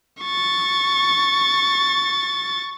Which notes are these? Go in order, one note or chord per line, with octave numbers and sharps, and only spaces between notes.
C#6 A6